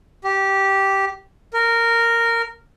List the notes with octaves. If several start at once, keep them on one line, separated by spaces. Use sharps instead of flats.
G4
A#4